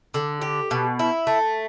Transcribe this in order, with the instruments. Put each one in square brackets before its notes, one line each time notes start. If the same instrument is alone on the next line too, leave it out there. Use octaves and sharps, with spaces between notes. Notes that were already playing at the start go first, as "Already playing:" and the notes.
[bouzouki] D3
G4
B2
E4
A3